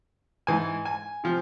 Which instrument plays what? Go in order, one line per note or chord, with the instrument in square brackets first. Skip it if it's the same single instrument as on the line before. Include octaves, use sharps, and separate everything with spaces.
[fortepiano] G#2 E3 G#5
G#5
C3 F3